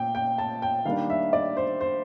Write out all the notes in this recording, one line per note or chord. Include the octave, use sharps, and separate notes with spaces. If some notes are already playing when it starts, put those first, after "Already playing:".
Already playing: A#2 G5
G5
A5
G5
D#3 G3 A#3 D4 F5
E5
D5
C5
C5